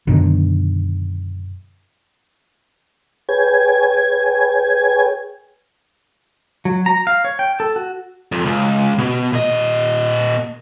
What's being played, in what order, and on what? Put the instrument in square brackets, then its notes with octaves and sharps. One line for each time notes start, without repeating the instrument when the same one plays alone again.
[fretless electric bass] F#2 B2 D3 D#3
[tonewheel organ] G#4 B4 C#5 G5 G#5 G#6
[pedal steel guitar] F#3
A#5
F5
C#5
G5
A4
F#4
[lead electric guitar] F2
C#2
B2
A#2 D#5